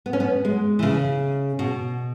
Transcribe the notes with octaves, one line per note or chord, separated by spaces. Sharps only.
B3
C#4
B3
G#3
E3
C#3
B2